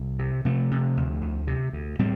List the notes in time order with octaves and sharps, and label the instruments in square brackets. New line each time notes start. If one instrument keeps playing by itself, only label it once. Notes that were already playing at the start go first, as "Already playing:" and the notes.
Already playing: [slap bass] C2
C3
C3 F3 A3
C3
D2
D2
C3
D2
A2 G3 C4